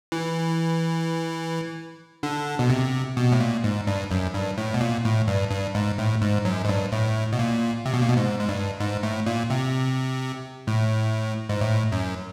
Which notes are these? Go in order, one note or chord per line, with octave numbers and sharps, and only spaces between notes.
E3
D3
B2
C3
B2
A2
A#2
G#2
G2
F#2
G2
A2
B2
A#2
A2
G2
G2
G#2
A2
G#2
F#2
G#2
G2
A2
B2
A#2
C3
B2
A#2
B2
G#2
G#2
G2
G#2
A2
A#2
C3
A2
G#2
A2
F#2